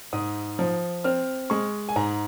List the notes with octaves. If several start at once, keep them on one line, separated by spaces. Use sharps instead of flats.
G#2 D#6
F3
C4 F6
G#3 C#6
G#5
G#2 A#5